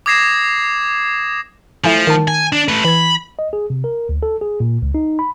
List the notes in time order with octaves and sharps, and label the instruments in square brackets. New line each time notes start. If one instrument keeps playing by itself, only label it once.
[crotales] D6 D#6 G#6 A#6 C7 E7
[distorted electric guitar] F3 [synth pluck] A3 E4 G#5
[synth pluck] D#3 A5
[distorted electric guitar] G#5
D4
A3 B4
[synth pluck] E3 G#6 [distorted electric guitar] B5
[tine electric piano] D#5
G#4
C3
A#4
D2
A4
G#4
A#2
C#2
D#4
B5